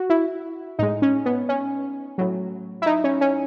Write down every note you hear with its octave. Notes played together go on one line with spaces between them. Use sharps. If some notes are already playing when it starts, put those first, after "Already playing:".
Already playing: F#4
E4
A2 G#3 D#4
C#4
B3
C#4
A2 F#3
E4
D#4
C#4
C#4